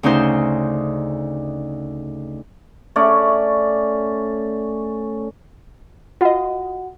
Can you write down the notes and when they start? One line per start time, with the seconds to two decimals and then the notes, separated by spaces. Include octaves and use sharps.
0.03 D2 C#3 C#4 D#4 C5 G6
2.96 A3 C#4 D5
6.21 F4 F#4 D#5 F#5